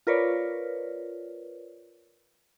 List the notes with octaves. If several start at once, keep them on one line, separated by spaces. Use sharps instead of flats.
F4 A#4 B4 C#5 D5